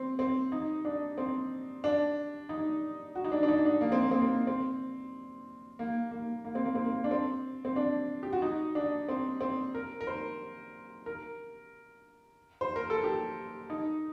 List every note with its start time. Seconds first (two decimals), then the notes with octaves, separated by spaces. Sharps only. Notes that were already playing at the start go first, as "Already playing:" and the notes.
Already playing: C4
0.19 C4
0.52 D#4
0.85 D4
1.18 C4
1.84 D4
2.49 D#4
3.15 F#4
3.24 D#4
3.32 D4
3.43 D4
3.48 D#4
3.65 D4
3.81 A#3
3.92 C4
4.02 A#3
4.11 C4
4.22 A#3
4.47 C4
5.79 A#3
6.11 A#3
6.45 A#3
6.55 C4
6.65 A#3
6.75 C4
6.85 A#3
7.04 D4
7.11 C4
7.65 C4
7.76 D4
8.23 G4
8.33 F#4
8.42 D#4
8.75 D4
9.09 C4
9.41 C4
9.75 A#4
10.01 A#4
10.07 C5
11.06 A#4
12.61 C5
12.76 A#4
12.90 A4
13.04 G4
13.70 D#4